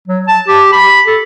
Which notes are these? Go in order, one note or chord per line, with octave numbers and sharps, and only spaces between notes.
F#3
A5
G4
B5
A4